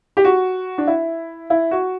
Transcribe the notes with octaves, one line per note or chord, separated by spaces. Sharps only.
G4
F#4
D4
E4
E4
F#4